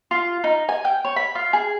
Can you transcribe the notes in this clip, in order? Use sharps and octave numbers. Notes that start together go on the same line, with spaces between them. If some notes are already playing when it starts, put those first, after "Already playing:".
F4
D#4
G#5
G5
C#5
B5
F4
G#4